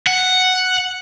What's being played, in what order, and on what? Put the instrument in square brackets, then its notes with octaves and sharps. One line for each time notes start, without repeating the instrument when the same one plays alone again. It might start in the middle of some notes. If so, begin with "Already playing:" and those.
[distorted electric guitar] F#5